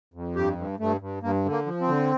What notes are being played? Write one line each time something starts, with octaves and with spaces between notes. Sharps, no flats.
F2
G2 G4
G2
G2 A3
G2
G2 A#3
D3
A#3
F3
C4
D3